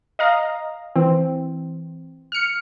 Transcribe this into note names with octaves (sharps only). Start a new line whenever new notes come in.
D#5 F5 A#5
E3 C4
F6 C#7